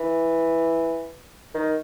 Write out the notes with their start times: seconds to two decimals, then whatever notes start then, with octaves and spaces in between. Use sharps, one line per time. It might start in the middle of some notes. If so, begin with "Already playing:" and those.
Already playing: E3
1.54 D#3